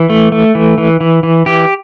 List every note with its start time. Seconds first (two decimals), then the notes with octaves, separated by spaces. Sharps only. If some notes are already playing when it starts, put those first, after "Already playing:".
Already playing: E3
0.09 A3
0.32 A3
0.55 E3
0.78 E3
1.01 E3
1.23 E3
1.46 E3 G4